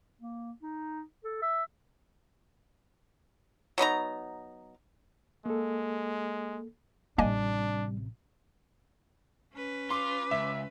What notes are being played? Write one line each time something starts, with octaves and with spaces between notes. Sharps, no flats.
A#3
D#4
A4
E5
F#3 B3 D#4 A#5
G#3 A#3 A4
A1 C3 G3 A#3 D4 D#5 G#5
C#4 B4
F4 C6 D6
C#2 E5